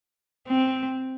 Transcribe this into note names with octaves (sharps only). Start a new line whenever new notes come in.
C4